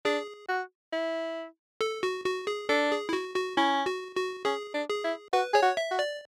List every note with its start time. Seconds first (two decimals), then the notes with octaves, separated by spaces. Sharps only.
0.05 D4 G#4
0.49 F#4
0.93 E4
1.81 A4
2.03 F#4
2.25 F#4
2.47 G#4
2.69 D4 A4
2.91 G#4
3.09 E4
3.13 F#4
3.35 F#4
3.57 C#4 E4
3.86 F#4
4.16 F#4
4.45 C#4 G#4
4.74 D4
4.89 G#4
5.04 E4
5.33 F#4 B4
5.53 G#4 C#5
5.62 F#4
5.77 E5
5.91 F#4
5.99 D5